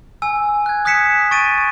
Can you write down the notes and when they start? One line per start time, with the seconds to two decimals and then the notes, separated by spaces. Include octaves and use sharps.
0.22 G#5 E6
0.66 F#6 G#6
0.85 D#6 F#6 G#6 B6 C#7 E7
1.31 C#6 A6 D7 D#7